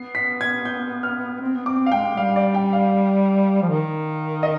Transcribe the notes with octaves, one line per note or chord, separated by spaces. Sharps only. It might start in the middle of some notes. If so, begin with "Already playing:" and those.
Already playing: B3 C7
B6
G#6
G6
F6
C4
B3
C4 D6
F5
G#3 G5
G3 F5
D5
G5
F5
F3
D#3
D#5